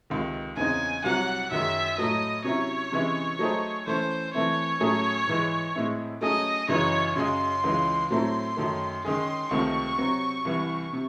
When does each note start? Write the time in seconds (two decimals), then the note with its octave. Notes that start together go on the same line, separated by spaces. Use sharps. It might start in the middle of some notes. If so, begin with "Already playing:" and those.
0.10 C#2 C3 D#3
0.56 E2 C#3 G#3 C4 D#4 G#5
1.04 C2 C3 F#3 F#5
1.50 F#2 D#3 G#3 E5
1.98 A2 F#3 A3 D#5
2.44 C3 F#3 C#4 E4 C#5
2.92 C3 E3 G#3 C#4 E4
3.39 F#3 A3 D#4 G#4 C5
3.87 E3 A3 C#4 C5
4.33 E3 A3 C4 E4 C#5
4.80 A2 F#3 A3 C#4 G#4
5.27 G#2 E3 G#3
5.75 A2 G#3 C4 E4
6.21 F#3 A3 C#4 G#4 D#5
6.68 F#2 C#3 E3 G#3 D#4 C#5
7.16 F#2 C#3 G#3 C#4 G#4 C6
7.64 C#2 C#3 E3 G#3
8.11 A2 F#3 A3 C4 E4 C6
8.57 F#2 D#3 A3
9.04 D#3 G#3 C#4 G#4 C6
9.51 C#2 C3 D#3 A3 C4 C#6
9.98 C3 F#3 C4 F#4
10.45 C2 C3 E3
10.93 C3